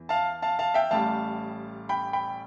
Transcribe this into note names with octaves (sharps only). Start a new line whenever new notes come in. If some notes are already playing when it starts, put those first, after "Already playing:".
Already playing: E2 E3
F5 A5
F5 A5
F5 A5
E5 G5
A1 A2 G3 F5 A5
G5 B5
G5 B5